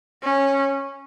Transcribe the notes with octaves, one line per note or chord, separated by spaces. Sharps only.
C#4